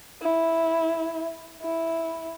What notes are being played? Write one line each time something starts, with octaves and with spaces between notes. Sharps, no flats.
E4
E4